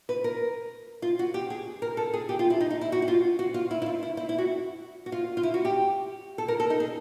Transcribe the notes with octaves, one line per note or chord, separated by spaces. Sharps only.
B4
A#4
F4
F#4
G4
G#4
A#4
A4
G#4
G4
F4
E4
D#4
D#4
E4
F#4
F#4
F4
F#4
F4
E4
E4
F4
E4
E4
E4
F#4
F#4
F4
F4
E4
F#4
G4
A4
A#4
A4
D#4
G#4